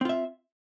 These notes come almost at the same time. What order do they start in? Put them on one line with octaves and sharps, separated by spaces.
C4 F4 E5